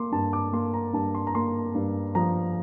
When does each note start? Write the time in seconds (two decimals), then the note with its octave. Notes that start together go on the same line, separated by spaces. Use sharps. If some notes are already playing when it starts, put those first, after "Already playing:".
Already playing: A#3 C6 D6
0.12 G2 A5
0.33 D6
0.53 A#3 C6
0.74 A#5
0.93 G2 A5
1.15 C6
1.27 A#5
1.35 A#3 C6
1.75 G2
2.15 F3 A#5